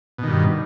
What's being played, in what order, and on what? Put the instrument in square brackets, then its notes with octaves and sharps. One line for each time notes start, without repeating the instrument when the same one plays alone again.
[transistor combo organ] B2
D#3
G2